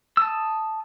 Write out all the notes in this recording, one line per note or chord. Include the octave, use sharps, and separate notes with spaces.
A5 D#6 E6